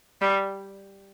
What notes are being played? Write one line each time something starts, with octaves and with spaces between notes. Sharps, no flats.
G3